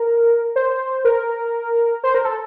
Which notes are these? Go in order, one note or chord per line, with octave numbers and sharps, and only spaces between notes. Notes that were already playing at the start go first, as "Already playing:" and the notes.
Already playing: A#4
C5
A#4
C5
A#4
A4